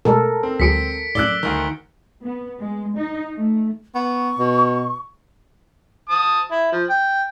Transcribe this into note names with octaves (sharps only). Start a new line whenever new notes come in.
B2 G#3 A3 A4 A#4
C4
D2 F#3 G#3 B6 C#7 D7
F#2 A2 D5 E6 F#6 G7
D2 D#3
B3
G#3
D#4
A3
B3 C#6
B2
A5 D#6
E4
F3
G5